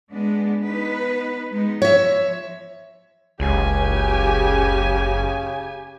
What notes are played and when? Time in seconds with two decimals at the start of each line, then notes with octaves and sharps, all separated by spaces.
0.12 G#3 B3 D4
0.62 B3 D#4 B4
1.52 G#3 B3 D#4
1.82 F3 C#5 E5
3.40 F#1 C#2 C#3 G4 G#5